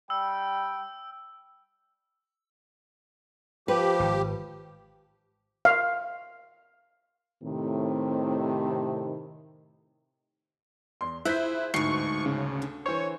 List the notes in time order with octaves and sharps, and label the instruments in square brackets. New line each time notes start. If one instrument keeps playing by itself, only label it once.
[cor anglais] G3 [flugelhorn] G5 [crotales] E6
[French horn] F3 [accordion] G4 [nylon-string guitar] B4
[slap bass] G#1
[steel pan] F5
[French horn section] A2 C3 D#3
[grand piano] E2 C6
[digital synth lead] E4 [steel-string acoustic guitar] F4 G#4 C5 [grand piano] F#6 G6 B6
[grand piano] D1 D2 C7 [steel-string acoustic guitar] G#2 E3 [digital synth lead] C#6
[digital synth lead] C#3
[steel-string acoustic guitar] D3
[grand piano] E3 C5 [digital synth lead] C#5